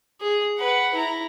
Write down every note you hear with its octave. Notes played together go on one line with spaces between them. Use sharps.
G#4
B4 F#5
E4 A#5